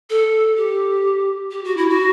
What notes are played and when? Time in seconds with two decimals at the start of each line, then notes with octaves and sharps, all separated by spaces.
0.10 A4
0.57 G4
1.51 G4
1.64 F#4
1.77 E4
1.89 F#4